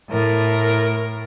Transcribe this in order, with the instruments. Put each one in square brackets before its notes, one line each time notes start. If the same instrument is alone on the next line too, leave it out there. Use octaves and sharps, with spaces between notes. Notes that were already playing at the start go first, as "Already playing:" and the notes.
[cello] A2 A#4